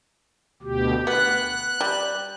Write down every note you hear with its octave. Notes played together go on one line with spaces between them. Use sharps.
D2 B2 G4
B3 F#6
G3